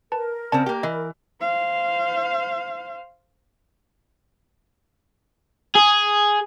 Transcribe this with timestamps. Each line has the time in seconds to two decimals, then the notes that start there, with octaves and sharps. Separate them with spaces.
0.12 A#4 B4 A5
0.52 C#3 C4 D5 A5
0.66 A#3 G4 G5
0.83 E3 D#5
1.40 C5 F5
5.76 G#4